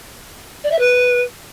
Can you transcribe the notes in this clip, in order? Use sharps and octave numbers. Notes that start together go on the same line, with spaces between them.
D5
E5
B4